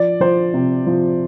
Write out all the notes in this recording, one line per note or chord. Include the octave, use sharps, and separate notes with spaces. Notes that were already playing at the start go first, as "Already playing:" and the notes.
Already playing: F3 D5
F3 C5
C3
F3